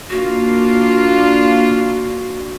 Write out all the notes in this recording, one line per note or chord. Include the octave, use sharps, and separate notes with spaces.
A#3 D4 F4 F#4